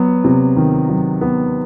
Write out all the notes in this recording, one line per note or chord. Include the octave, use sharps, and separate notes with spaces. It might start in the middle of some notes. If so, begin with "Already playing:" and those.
Already playing: F#3 B3
C3
D#3
F#3
B3